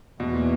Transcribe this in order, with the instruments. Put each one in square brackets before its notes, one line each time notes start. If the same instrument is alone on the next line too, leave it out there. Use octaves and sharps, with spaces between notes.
[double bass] E2 [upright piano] B2
[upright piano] A#2